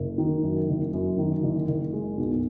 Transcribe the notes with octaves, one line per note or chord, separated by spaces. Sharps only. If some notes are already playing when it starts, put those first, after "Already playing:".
Already playing: F#1
D#3
F#2
F#1
F#2
D#3
F#1
F#1
G#3
B1